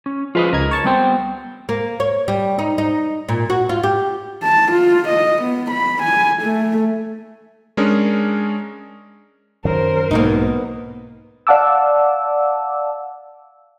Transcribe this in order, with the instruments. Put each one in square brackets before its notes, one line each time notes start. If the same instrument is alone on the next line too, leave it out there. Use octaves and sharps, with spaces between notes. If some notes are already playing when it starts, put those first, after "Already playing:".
[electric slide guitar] C#4
[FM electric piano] F3 G#3 [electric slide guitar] F4 B4 D#5
[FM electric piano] C#2 D#4 G#6 [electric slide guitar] A#4
[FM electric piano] C#5 A5 C#6
[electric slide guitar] G3 B3 G5 [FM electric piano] C4 A5
[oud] A#3
C#5
G3
D#4
D#4
A#2
F#4
F4
G4
[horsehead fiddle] A5
F4
D#5
B3
B5
G#5
A3
[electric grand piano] G#3 C#4 D4 G#4 A#4 C#5
[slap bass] F#2 D#3 F#3 [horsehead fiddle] A#4 C5
[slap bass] B1 G#2 B2 [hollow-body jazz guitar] A#3 B3 D#4
[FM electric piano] D5 F5 F#5 A5 D6 E6